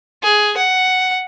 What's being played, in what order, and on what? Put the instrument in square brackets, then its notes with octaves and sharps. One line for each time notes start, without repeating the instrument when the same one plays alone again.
[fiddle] G#4
F#5